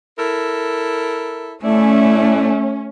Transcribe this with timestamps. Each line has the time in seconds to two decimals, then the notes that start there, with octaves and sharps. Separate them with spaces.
0.19 E4 A4 A#4
1.64 A2 A3 C#4 E4 D5